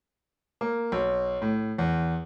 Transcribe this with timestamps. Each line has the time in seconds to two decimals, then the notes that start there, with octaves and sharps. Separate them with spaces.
0.61 A#3
0.92 B1
1.42 A2
1.78 E2